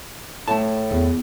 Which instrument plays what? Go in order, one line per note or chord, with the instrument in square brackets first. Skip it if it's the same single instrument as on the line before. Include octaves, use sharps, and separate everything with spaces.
[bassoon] A2 [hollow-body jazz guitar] A3 A5
[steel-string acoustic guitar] E2